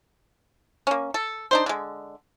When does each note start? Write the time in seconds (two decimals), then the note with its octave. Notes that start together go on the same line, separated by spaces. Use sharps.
0.87 A#3 C#4
1.14 A4
1.51 D4 D#4 C5
1.66 D3 G#3